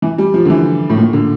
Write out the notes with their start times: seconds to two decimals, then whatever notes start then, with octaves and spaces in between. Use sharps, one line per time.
0.02 E3
0.18 G3
0.34 F3
0.45 D3
0.50 E3
0.90 A2
0.97 A#2
1.13 D3